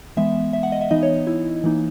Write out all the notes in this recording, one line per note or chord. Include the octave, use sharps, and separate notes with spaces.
E3 G#3 B3 E5
E5
F#5
D#5
E5
E3 B3 D#4 D#5
C#5
E4
E3 A#3 D#4